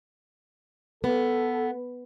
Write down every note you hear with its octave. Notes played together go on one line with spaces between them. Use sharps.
B3 A4